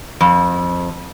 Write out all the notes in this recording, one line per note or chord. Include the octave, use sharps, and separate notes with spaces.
F2